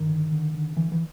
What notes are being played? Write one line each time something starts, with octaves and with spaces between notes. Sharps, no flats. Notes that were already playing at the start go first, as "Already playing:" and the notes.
Already playing: G2 D#3
D3
D3
D3
D3 E3
E3